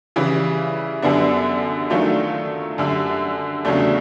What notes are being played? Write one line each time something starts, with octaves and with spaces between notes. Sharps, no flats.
C#3 E3 G3
F#2 D3 G3 B3 D4
D#3 F#3 A3 D4 F4
F#2 D3 G3
E2 C#3 F#3 A3 D4